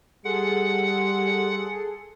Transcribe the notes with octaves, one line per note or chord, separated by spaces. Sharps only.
G3 G#4 A4 F#5 C6